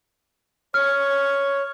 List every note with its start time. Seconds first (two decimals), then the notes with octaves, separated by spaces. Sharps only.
0.74 C#5 F6